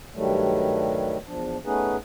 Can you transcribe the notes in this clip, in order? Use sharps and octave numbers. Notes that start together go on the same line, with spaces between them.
G2 D#3 F#3 G3 A3
E2 F3 D4
A3 B3 C#4 D#4 G#4 B4